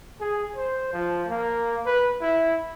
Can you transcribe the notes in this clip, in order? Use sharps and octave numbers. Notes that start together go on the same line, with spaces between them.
G#4
C5
F3
A#3
B4
E4